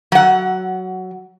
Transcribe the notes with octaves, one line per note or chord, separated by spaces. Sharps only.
F#3 F#5